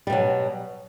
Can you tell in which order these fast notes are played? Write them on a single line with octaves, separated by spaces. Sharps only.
G3 B2 F#3